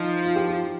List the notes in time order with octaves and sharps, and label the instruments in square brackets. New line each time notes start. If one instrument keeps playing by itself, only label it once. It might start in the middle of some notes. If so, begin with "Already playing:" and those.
Already playing: [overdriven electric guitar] F3 [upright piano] D#4
[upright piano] F4
G4
F4